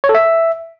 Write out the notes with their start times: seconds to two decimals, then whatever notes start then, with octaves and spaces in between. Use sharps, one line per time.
0.04 C#5
0.09 A4
0.15 E5